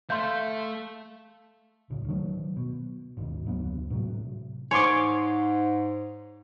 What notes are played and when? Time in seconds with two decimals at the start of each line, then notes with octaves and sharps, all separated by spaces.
0.10 A3 A4 E5 F5 C6 G6
1.90 D1 C#2
2.08 D#3 F#3 A3
2.57 B2
3.17 G#1 D#2
3.46 F1 D2 F#3 B3
3.90 A2 C3 D#3 F#3
4.71 G#2 C#5 G#5 C6 D6